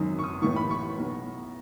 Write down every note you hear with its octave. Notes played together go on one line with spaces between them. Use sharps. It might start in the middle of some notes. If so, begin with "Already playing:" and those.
Already playing: G#1 F#2 D#3 D#6
C#6
D#6
A1 A2 E3 C#6
B5
C#6
B1 B2